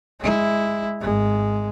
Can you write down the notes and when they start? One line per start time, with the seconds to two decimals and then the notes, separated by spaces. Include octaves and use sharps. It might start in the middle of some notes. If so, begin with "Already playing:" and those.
0.20 G#3 E4
1.01 G#1 G#3